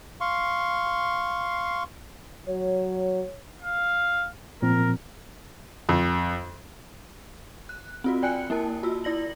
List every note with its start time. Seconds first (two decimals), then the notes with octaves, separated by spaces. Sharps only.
0.21 F5 C6 C#6
2.47 F#3 C#5
3.62 F5
4.62 A#2 F3 C4 A#4
5.89 F2
7.69 F#6
8.04 C4 F4 F#4
8.23 D5 G5 G#5 F#6 C#7
8.50 A#3 E4 A#4 A5
8.83 F4 F#4 E6
9.04 E4 D5 A#6 F#7